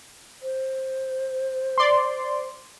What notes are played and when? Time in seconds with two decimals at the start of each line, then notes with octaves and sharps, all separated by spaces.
0.42 C5
1.78 D5 C6